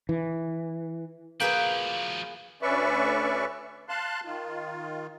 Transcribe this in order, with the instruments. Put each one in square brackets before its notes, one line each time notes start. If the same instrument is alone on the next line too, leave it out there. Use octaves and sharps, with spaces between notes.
[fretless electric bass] E3
[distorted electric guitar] F3 F#4 [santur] A#3 [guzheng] G#4 B4 G5
[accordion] D2 C#4 B4 D5 E5 C#6
F5 A5 C6 F#6
D#3 F4